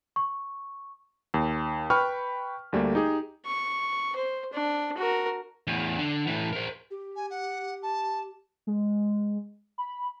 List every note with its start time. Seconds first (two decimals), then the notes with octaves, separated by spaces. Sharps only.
0.16 C#6
1.34 D#2
1.90 B4 G5 B5 C#6 F6
2.73 D2 G3 A3 A#3
2.95 D#4 G4 G#4
3.45 C#6
4.16 C5
4.53 D4
4.97 F#4 A#4
5.67 E2 A2
5.99 D3
6.27 A2 E3
6.53 A#4 C5
6.91 G4
7.16 G#5
7.30 F#5
7.83 A5
8.67 G#3
9.78 B5